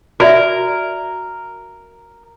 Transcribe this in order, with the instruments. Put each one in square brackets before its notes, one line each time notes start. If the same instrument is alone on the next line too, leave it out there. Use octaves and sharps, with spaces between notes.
[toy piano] F#4 D5 E5 [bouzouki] A#4